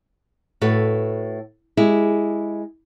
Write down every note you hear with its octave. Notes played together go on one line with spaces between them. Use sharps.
A2 F#4 A4 B4
G#3 E4 G4 G#4